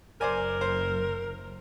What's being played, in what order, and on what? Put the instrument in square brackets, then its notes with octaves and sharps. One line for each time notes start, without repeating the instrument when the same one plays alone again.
[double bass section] F#1 [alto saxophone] A#4 [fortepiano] C5 D5 G#5
[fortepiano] C5